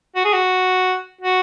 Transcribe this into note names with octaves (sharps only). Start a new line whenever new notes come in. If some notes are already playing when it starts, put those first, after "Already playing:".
F#4
G#4
F#4
F#4